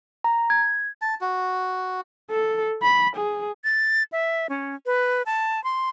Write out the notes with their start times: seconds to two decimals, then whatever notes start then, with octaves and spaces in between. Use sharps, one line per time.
0.24 A#5
0.50 G#6
1.02 A5
1.21 F#4
2.31 A4
2.82 B5
3.16 G#4
3.64 A6
4.12 E5
4.49 C#4
4.86 B4
5.26 A5
5.64 C6